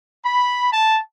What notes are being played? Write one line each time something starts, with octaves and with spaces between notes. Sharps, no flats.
B5
A5